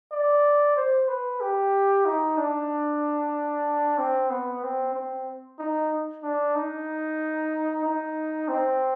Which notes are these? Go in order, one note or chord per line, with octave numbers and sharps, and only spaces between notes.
D5
C5
B4
G4
D#4
D4
C4
B3
C4
C4
D#4
D4
D#4
D#4
C4